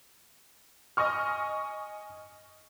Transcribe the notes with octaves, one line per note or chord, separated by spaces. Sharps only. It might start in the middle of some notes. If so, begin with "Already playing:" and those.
D#5 G#5 C#6 F6